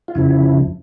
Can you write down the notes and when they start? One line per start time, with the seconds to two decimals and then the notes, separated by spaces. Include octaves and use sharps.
0.08 F4
0.15 F2 C#3 F3 E4